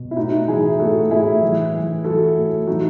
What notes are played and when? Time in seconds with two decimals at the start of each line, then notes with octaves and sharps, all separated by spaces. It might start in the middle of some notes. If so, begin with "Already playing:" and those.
Already playing: B2
0.11 E4
0.16 A2 D#4 F#4
0.48 E3 E4 G#4
0.79 A2 F#4 A4
1.11 A2 E4 G#4
1.42 E3
1.74 E3
2.04 E3 F#4 A4
2.36 A2
2.67 E3 D#4 F#4